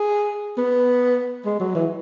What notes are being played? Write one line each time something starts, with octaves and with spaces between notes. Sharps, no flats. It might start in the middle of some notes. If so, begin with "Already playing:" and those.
Already playing: G#4
B3
G#3
F#3
E3